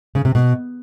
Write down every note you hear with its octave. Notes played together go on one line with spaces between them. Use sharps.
C#3
C3
B2